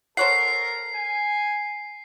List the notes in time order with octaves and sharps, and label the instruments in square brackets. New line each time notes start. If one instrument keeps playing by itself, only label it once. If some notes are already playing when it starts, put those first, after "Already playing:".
[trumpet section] A4 A#4 [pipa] C5 C#5 F#5 [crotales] C7
[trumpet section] G#5